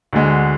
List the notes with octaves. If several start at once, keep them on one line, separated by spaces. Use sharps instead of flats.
D2 D3 G#3